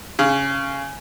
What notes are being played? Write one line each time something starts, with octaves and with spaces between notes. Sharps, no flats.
C#3